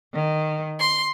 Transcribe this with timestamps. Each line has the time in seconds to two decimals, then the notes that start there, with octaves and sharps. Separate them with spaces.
0.12 D#3
0.79 C6